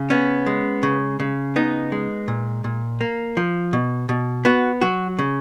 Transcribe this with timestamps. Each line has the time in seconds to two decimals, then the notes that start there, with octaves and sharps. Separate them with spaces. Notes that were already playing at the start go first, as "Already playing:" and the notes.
Already playing: C#3
0.10 B3 C#4
0.46 G#3
0.83 C#3
1.20 C#3
1.56 B3 D#4
1.92 G#3
2.28 A#2
2.64 A#2
3.01 A#3
3.37 F3
3.73 B2
4.09 B2
4.45 B3 F#4
4.81 F#3 F#4
5.19 C#3